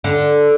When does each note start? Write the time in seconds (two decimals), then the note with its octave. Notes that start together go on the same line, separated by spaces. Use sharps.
0.04 D3